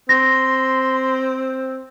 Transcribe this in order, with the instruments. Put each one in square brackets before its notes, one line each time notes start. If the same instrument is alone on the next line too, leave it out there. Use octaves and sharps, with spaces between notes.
[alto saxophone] C4 [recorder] C6 [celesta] A#6